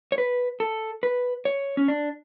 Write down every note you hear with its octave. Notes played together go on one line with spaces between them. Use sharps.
C#5
B4
A4
B4
C#5
C#4
D4